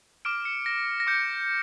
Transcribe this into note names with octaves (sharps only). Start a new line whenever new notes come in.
D6 F6 D7
C#7
A#6
A#6
D6 G6 C#7